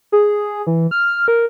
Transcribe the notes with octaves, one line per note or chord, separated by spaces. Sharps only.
G#4
E3
F6
A#4